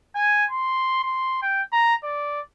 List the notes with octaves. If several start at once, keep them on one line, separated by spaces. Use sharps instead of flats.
G#5
C6
C6
G5
A#5
D5